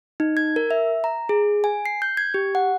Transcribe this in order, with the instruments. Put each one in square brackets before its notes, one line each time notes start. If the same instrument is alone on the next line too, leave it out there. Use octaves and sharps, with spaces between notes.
[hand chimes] D#4
G#6
A#4
E5
A#5
G#4
G#5
C7
G6
G#6
G4
F#5